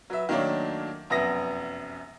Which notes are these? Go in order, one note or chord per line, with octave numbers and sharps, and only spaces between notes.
F#3 B4 E5
D#3 F#3 A3 A#3 D4 C#5
F1 F#2 B3 E5 D#6 A#6